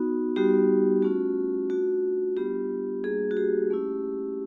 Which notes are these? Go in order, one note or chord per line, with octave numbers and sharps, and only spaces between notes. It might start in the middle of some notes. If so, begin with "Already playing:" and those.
Already playing: B3 D#4 F#4
G3 B3 D#4 F#4 G4
A3 C#4 F4 F#4
A3 D4 F4 F#4
G3 B3 D4 F4 G4
G3 A#3 D4 F#4 G#4
F#4
G4
A3 C#4 E4